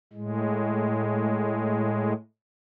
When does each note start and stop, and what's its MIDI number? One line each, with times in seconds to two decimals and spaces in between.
0.13 2.13 45
0.13 2.13 56